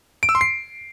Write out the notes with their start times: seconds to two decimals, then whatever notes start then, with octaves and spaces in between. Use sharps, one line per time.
0.23 D7
0.29 E6
0.35 C6
0.41 C7